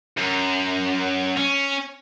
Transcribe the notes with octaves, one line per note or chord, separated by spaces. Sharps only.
F#2
C#4